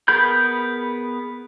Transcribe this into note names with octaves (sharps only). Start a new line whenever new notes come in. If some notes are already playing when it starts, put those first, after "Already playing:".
B3 G#4 A#4 B5 G6